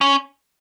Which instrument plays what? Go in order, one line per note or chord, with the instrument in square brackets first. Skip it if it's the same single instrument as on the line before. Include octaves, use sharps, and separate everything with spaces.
[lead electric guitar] C#4